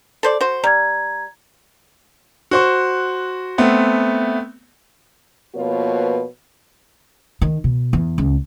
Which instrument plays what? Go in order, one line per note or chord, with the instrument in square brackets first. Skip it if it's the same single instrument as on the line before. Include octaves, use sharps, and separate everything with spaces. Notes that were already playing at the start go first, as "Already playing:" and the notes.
[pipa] A4 C5 D5
F#4 C5
[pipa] G3 [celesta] A#5 G#6
[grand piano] F#4 C5 C#6
A3 B3 C4
[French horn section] B2 F3 A#3 F4 B4 C#5
[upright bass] D#3
B2
E2
C#2